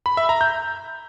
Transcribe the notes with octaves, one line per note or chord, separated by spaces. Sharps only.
B5
E5
A#5
G6